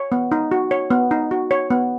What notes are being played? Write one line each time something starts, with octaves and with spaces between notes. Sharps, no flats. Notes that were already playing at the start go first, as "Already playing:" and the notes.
Already playing: C#5
B3
D#4
F#4
C#5
B3
D#4
F#4
C#5
B3